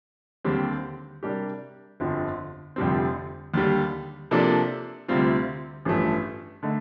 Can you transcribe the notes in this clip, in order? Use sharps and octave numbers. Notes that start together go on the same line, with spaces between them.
D#2 D3 G3 C4 G4
C3 G3 D4 G4 A#4
G1 F2 D3 F3
F1 F2 D3 G3 C4
D#2 D3 G3
C3 F3 A#3 D4 A4
D2 C3 G3 C4 F4
A1 G2 F3 A3
D3 A3 D#4